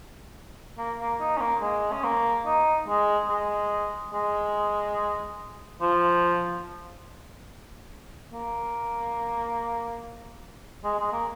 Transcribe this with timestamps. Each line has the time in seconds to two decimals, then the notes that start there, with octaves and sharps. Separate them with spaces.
0.78 A#3
1.00 A#3
1.20 D#4
1.37 C#4
1.41 A#3
1.61 G#3
1.92 C#4
2.04 A#3
2.46 D#4
2.88 G#3
3.29 G#3
4.13 G#3
5.81 F3
8.33 A#3
10.84 G#3
10.99 G#3
11.12 A#3